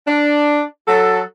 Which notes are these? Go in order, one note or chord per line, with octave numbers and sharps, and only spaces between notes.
D4
F#3 A4